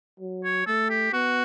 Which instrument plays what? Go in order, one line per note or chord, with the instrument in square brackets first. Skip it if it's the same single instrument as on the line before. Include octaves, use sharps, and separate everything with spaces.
[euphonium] F#3
[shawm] C#5
[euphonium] A3 [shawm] A4
[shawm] G4
[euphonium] B3 [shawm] F#4